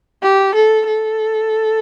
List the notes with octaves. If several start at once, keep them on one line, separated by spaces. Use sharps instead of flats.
G4
A4
A4